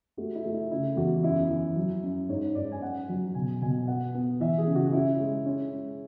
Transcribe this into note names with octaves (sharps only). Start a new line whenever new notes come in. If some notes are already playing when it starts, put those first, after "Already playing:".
A3 F#4
E4
A3
E4
C#3 E4
E2 F#4
F#2 E4
E3
F#3
F#2
G#2 C#5
G#2 D5
G#5
F#2 F#5
F#3
B2 G#5
B2 G#5
B3 F#5
B3
E3 E5
G#4
C#3
F#4
F#4
C#4 E4
G#3
C#4
G#3